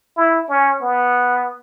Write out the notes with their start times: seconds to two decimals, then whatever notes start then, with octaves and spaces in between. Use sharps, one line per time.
0.17 E4
0.49 C#4
0.82 B3